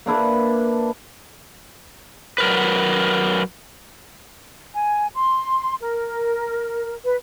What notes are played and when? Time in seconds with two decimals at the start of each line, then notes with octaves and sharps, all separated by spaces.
0.06 A#3 D4 E4 B4
2.38 F#3 A#4 B4
4.75 G#5
5.15 C6
5.81 A#4
7.05 B4